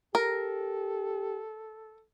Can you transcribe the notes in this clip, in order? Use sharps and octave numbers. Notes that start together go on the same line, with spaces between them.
G4 A4 A#4